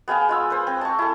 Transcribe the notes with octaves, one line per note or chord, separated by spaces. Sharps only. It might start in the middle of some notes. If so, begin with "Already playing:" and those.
B3 G#4 F5 G5
G#3 F4 E6
B4 C5
C4
A5 C#6
E4 A4